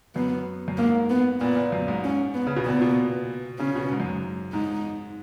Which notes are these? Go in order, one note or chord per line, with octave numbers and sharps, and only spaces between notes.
F#2 B3
F#2
G#2 A#3
B3
A#2 B3
A#2
F#2
G#2
C#4
B3
C#3
B2
A#2 B3
B2
C#3 C#4
B2
G#2
F#2
G#2
G#2 D#4